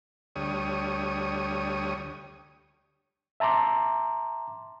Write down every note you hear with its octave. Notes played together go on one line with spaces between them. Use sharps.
D2 G3 C#5 D#6
E5 A5 A#5 C6 D6